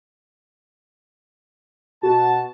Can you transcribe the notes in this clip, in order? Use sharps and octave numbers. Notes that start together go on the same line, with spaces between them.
B2 F#4 A5